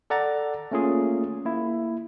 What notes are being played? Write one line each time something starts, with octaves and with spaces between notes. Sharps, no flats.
A4 D5 F#5 A#5 A6
A3 A#3 C#4 F4 G#4
A#3 E4